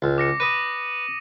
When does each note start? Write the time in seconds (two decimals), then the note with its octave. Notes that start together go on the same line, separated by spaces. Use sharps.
0.02 C#2
0.18 D6 A#6 C#7
0.40 B4 D#6 A#6 D#7